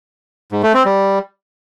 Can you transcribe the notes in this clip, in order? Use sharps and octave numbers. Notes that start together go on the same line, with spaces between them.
G#2
A3
C4
G3